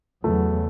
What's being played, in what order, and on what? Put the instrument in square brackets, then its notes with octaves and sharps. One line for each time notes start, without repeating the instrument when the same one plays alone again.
[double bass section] E2 C#3 F#3 B3 [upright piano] A3